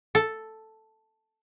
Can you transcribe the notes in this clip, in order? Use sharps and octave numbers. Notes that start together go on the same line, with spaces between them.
A4